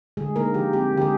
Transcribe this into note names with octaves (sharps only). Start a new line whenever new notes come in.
D3 G#3 G#4
A#3 D#4 A#4
F3 G4
C4 G4
D3 G4
G#3 G#4